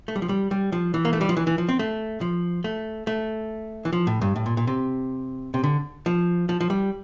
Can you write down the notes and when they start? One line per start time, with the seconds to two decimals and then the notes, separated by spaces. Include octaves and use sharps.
0.08 A3
0.16 G3
0.22 F3
0.29 G3
0.51 G3
0.72 F3
0.94 E3
1.05 A#3
1.13 A3
1.21 G3
1.29 F3
1.37 E3
1.47 E3
1.58 F3
1.69 C4
1.79 A3
2.21 F3
2.64 A3
3.07 A3
3.85 E3
3.93 F3
4.07 A2
4.21 G2
4.36 A2
4.46 A#2
4.57 A#2
4.67 C3
5.54 C3
5.64 D3
6.06 F3
6.49 F3
6.61 F3
6.70 G3